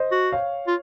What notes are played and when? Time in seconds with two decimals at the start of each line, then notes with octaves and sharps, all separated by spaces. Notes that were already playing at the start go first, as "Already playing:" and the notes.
Already playing: C5 D#5
0.11 F#4
0.32 C#5 F5
0.67 F4